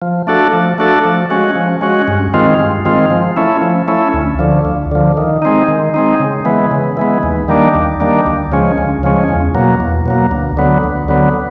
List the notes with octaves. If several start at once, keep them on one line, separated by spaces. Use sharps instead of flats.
F3
A3 D4 F#4 A4
F3
A3 D4 F#4 A4
F3
G#3 C#4 F#4
F3
G#3 C#4 F#4
G2
D#3 G#3 C4 F4
G2
D#3 G#3 C4 F4
F3
A3 C#4 E4
F3
A3 C#4 E4
D2
D3 F3
D2
D3 F3
D#3
G#3 C4 D#4
D#3
G#3 C4 D#4
C#3
E3 G#3 B3
C#3
E3 G#3 B3
D#2
D#3 G3 A#3 D4
D#2
D#3 G3 A#3 D4
D2
C#3 F3 G#3 C#4
D2
C#3 F3 G#3 C#4
E2
B2 F#3 A#3
E2
B2 F#3 A#3
D2
D3 F#3 B3
D2
D3 F#3 B3